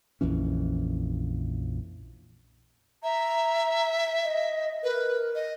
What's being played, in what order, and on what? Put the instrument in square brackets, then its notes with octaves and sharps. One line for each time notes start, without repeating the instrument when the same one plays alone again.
[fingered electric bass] A#1 F2 E3 C#4
[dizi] E5 [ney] A#5
[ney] D#5
[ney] A#4 [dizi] B4
[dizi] D#5